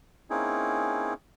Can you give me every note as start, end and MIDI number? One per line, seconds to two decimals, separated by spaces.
0.30 1.14 58
0.30 1.14 60
0.30 1.14 61
0.30 1.14 63
0.30 1.14 64
0.30 1.14 68